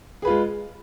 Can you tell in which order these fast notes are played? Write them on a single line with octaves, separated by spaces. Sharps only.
G#4 B4 F4 G#3